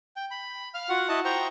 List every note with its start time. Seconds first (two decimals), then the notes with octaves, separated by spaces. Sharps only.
0.16 G5
0.31 B5
0.74 F5 F6
0.89 F4 F#4 F#5
1.09 E4 F#4 D#5 A5
1.25 C5 G5 A#5 C#6